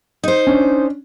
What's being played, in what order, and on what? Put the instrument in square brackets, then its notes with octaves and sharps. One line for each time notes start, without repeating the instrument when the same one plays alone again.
[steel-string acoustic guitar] D#4 C5
[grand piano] C#4 D4